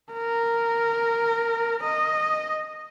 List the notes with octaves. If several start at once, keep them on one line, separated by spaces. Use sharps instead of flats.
A#4
D#5